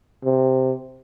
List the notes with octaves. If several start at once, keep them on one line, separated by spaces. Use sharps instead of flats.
C3